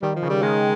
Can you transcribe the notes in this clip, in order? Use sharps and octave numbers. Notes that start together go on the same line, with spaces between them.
D#3 G3
F3
C#3
G3
D#3 G#3